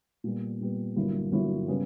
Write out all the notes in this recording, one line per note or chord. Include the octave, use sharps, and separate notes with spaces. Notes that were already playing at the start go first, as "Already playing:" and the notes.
A#2 G3 B3
A#2 G3 B3
G1 G2 F#3 A#3 E4
G1 G2 F#3 A#3 E4
C#3 G3 B3